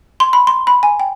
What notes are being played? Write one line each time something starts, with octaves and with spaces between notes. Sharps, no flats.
C6
B5
C6
B5
G#5
G5